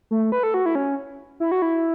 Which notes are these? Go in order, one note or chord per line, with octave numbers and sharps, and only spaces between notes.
A3
B4
A4
F#4
E4
C#4
E4
F#4
E4